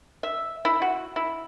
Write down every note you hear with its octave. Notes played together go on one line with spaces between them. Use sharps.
E5
E4
F#4
E4